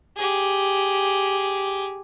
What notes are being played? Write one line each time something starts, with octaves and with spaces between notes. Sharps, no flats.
G4 G#4